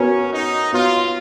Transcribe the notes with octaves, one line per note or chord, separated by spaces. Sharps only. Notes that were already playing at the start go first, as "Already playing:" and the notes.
Already playing: B3 C#4 F#4 A#4 C#5
D#4
B3 F4 F#4 C#5